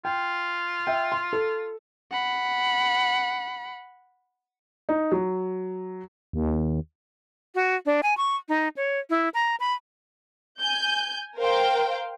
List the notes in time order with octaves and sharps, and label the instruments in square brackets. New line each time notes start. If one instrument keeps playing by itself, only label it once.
[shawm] F4 [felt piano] G5
[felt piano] E5 G5
C6
A4
[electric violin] F#5 B5
[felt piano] D#4
F#3
[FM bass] D#2
[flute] F#4
D4
G#5
C#6
D#4
C#5
E4
A#5
B5
[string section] G#5 G6
A#4 C5 F5 G5